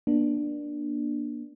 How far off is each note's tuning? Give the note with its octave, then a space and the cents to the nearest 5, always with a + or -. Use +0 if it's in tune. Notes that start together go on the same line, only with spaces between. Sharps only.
A#3 +40 D4 +10